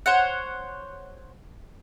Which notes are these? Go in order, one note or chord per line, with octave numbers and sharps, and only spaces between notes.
C5 C#5 F#5